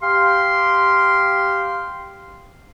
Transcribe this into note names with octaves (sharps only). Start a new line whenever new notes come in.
G4 F5 C6